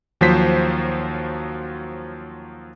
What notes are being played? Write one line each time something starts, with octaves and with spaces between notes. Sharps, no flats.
D#2 F3 F#3 C5 B6